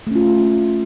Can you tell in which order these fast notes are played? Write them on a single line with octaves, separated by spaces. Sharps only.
A3 C#4 F4